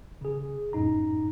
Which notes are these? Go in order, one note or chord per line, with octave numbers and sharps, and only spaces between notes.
C#3 G#4
F#2 A2 D#4 A#5